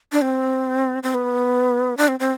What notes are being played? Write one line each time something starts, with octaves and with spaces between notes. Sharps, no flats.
D4
C4
C4
B3
D4
C4
C4